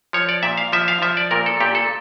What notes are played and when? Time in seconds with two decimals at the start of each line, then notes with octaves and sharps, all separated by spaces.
0.13 F3 C#5
0.29 D5
0.43 A#2 E5
0.57 F5
0.72 F3 E5
0.88 F5
1.02 F3 E5
1.17 D5
1.31 A#2 A#4
1.46 A4
1.61 A#2 G4
1.75 A4